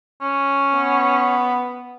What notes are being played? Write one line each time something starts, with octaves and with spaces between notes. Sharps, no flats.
C#4
B3